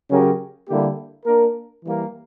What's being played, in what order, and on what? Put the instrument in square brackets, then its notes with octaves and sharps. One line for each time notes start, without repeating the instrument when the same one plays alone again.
[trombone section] C#3 F#3 C#4 G4 A#4
D3 G3 A#3 E4 G4
A#3 D4 A#4
E3 G3 A#3